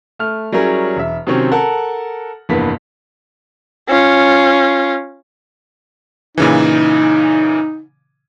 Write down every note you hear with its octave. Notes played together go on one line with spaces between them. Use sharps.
A3 F6
F#3 G3 C#4 E4 G#4 A#4
E1 E5
C3 D#3 F#3 C4 C#4
A4 A#4 F#5 A5
F1 G2 E3 A#3 B3 B6
C#4 F4
A#2 C#3 E3 D#4